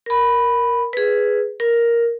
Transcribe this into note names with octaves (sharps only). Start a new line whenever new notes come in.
A#4 B5
G#4 B4
A#4